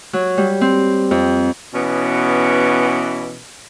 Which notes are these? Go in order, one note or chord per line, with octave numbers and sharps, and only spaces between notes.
F#3
G3
C4
F2
B2 E3 B3 C#4